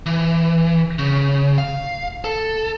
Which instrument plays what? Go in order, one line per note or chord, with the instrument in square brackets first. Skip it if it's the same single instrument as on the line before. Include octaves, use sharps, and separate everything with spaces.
[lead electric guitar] E3
C#3
F5
A4